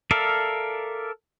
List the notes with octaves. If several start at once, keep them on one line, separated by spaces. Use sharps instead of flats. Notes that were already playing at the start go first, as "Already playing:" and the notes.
A4 A#4 D5 E5 F5